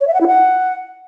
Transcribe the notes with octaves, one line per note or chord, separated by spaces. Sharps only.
C#5
E5
F#5
E4
F#5